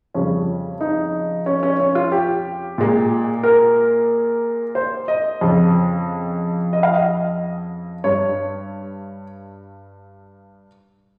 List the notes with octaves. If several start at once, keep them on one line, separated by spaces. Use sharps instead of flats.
F2 C#3 G3 C#4
D#4
C#4
C#4
C#4
F4
G4
A#2 G#3
A#4
C5
D#5
F2 C#3 F3
D#5
F5
D#5
G2 G3 C#5